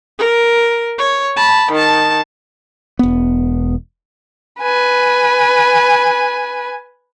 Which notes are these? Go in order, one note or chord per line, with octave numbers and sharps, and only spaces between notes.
A#4
C#5
A5 B5
D#3 A5
E1 B3
B4 G#5